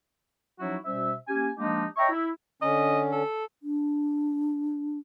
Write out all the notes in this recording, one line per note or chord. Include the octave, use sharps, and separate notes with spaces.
F3 F#3 C#4 D#4 E4 F#4
B2 G3 C#4 C5 E5
A#3 C#4 G4 G#5
F3 G#3 A#3 D4 D#4 G4
C#5 D#5 E5 G5 A#5 C#6
E4
D3 C#4 D#5
A4
D4